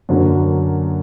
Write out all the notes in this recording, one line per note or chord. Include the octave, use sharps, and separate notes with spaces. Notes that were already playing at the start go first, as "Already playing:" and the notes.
F#2 D3 F#3 A#3